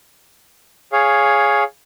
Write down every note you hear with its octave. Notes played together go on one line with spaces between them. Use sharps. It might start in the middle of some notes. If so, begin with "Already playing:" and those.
G#4 C#5 F5